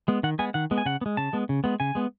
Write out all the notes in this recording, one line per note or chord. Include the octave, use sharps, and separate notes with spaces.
G#3 B3
D#3 F#5
G#3 B3 G#5
D#3 F#5
G#3 B3
G#5
C#3 F#5
B3
G#3
C#3 A5
G#3 B3
C#3
G#3 B3
C#3 G#5
G#3 B3